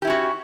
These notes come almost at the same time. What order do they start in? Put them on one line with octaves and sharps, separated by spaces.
G4 E4 C#4 F#4